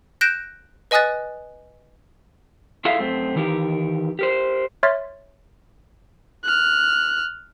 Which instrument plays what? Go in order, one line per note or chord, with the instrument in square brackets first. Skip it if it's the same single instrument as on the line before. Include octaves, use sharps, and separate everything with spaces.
[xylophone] F#6 G6 A#6 D7 E7
B4 D#5 G#5 D#6 F#6 A6
[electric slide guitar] E4 F4 G#4 A4 E5 F5
F#2 A3 C4
D#3 E3 D#4 G4 A#4
G4 A#4 C5
[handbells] C#5 E5 C6 F6 A6 B6
[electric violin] F6 F#6